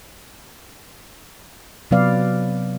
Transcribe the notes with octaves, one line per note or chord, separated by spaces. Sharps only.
C3 F#3 B3 B4 D5 F5